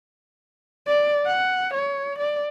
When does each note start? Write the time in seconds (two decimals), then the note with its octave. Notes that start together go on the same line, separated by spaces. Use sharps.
0.87 D5
1.26 F#5
1.74 C#5
2.19 D5